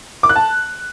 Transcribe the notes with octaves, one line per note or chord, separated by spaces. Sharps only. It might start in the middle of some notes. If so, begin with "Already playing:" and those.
D6
F#6
A5